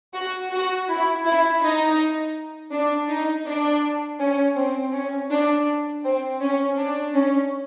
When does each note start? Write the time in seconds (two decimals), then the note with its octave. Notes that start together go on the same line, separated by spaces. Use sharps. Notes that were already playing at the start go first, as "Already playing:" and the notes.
0.14 F#4
0.51 F#4
0.89 E4
1.25 E4
1.62 D#4
2.72 D4
3.09 D#4
3.46 D4
4.19 C#4
4.56 C4
4.93 C#4
5.30 D4
6.04 C4
6.41 C#4
6.77 D4
7.14 C#4